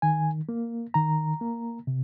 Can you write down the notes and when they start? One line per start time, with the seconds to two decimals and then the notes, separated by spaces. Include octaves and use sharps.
0.02 D#3 G#5
0.49 A#3
0.94 D#3 A#5
1.41 A#3
1.87 C3